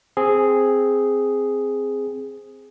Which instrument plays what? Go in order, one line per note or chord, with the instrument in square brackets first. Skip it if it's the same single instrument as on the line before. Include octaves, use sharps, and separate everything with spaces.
[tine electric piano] C4 G#4